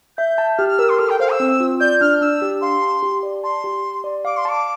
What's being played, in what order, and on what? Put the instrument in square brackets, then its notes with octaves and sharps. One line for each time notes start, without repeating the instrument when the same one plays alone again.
[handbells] E5 [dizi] G6
[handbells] A5
[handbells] G4 [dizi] F6
[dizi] F6
[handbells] A#4 [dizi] E6
[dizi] C6
[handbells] A4 [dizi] F6
[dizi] G5
[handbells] C5 [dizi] F5
[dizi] E6
[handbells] C4
F4
[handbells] D5 [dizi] G6
[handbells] D4 [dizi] F6
[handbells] D4 [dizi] E6
[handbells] G4
[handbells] F5 [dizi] C6
[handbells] A5
G4
D5
[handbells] A5 [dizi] C6
[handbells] G4
G4
D5
[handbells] F5 [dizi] D6
[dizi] C6
[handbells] A5 [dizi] D6